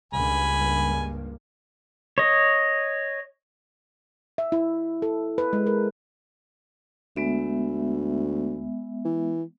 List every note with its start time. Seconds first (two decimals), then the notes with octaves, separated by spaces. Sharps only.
0.13 C#2 G2 A#3 G#5 B5
2.18 C#5 D#5
4.38 E5
4.52 E4
5.02 A4
5.38 B4
5.53 G#3
5.67 A#4
7.16 D2 G#3 B3 E5
9.05 E3